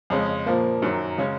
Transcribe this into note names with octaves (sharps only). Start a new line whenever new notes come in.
F2 C#3 G#3 C#4
A#2 F3 A#3
F#2 D#3 F#3
C#3 G#3 C#4